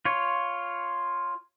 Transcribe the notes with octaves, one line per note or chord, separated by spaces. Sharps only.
F4 C#5